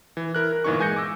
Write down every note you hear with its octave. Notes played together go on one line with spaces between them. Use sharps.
E3
E4 A#4 F#6
A#4
G1 A#2 E3 D#4 C#6
G#3 G#5 G6 A#6 C#7
D6 E6